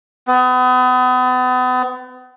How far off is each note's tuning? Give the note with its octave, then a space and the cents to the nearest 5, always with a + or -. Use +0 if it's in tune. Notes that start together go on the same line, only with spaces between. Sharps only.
B3 +35